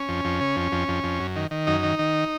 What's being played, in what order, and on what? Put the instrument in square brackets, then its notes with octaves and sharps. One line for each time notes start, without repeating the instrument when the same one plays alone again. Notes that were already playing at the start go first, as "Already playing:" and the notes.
Already playing: [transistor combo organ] C#4
F2
F2
C#3
F2
F2
F2
F2
F#2
D#3
D#3
F#2 D#4
D#3
D#3